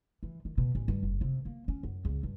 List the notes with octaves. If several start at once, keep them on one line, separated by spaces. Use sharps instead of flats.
E3
D#3
B2
A1
G2
F#1
C3
A#3
C#4
F#2
C#2
G2